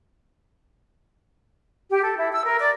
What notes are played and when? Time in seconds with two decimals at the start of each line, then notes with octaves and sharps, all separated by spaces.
1.90 G4
2.04 A4
2.17 E4
2.32 E6
2.46 A#4
2.59 D5